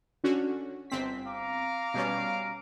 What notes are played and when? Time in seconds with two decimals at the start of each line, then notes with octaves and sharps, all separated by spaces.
0.24 D3 C#4 F#4
0.90 G1 C4 B6
1.26 F5 A#5 D6
1.94 B2 G3 C#4